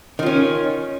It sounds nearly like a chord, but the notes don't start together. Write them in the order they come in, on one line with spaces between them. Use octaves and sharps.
D#3 F4 C#4